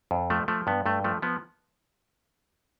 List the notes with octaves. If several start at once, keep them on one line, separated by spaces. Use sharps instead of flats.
F2
F3 A3
F3 A3
G2 B3
G2 A3
F3 A3
F3 B3